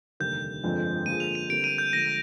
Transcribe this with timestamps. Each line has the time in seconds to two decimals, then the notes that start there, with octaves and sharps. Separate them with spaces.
0.20 F1 D#2 D3 G3 A#3 G6
0.63 G1 F2 D3 F3 G#3
1.06 D3 F3 A#3 F4 G#4 D#7
1.20 F7
1.35 D#7
1.50 D3 G3 C4 G4 A#4 D7
1.64 D#7
1.78 G6
1.93 D3 F3 G#3 A#6